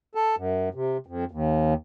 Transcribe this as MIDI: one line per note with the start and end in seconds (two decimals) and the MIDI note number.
0.15 0.35 69
0.37 0.69 42
0.74 0.97 48
1.06 1.25 41
1.31 1.74 39